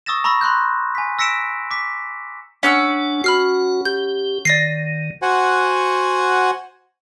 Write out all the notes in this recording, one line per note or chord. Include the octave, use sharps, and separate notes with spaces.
C#6 D#6 E6 A6 A#6 E7
A#5 B5 C#6 E6 A#6
B5 C6 F#6 G6
G#5 B6
E6 A#6 B6 C#7 D7 E7
D6 B6
C#4 D4 F#5 E6
F#4 B5 F6 C7
G4 G6
D#3 D5 A#6 C7
F#4 C5 F#5 G#5